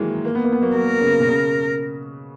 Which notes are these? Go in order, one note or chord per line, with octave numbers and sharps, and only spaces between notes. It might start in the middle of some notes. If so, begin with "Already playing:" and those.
Already playing: D#3 E3 F#3 G#3 A#3
A#3
B3
A#3
B3
F#3 A#3
F#3 A#3 A#4
C#3
B2
C#3